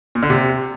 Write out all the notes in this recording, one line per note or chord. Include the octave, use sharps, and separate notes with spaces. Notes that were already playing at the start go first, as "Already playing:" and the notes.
A#2
D3
C3